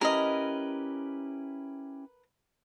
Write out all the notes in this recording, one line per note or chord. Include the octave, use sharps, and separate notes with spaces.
C#4 E4 G4 A#4 B4 D#5